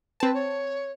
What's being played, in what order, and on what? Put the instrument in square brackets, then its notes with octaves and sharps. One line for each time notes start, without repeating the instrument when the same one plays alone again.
[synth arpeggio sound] C4 A5 [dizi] B4
[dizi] C#5